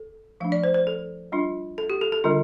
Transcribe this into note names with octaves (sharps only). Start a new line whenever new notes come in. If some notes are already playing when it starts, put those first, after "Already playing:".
Already playing: A4
F3 A3 D4 F5
D5
C5
C5
A4
G3 D4 F4
A4
G4
A4
A4
D3 G3 D4 F4